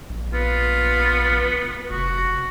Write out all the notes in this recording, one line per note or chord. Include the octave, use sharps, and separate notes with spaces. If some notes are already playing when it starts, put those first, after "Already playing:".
A#1
B3 F4
F1 F#4